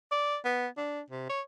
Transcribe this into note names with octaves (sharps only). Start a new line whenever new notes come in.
D5
B3
D4
C3
C#5